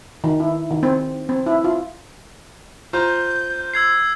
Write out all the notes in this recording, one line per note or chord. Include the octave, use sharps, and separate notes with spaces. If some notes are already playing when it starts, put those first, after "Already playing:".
D#3
E4
D#3
C4
C4
E4
F4
F4 C5 A#5 G6
E6 G#6 C7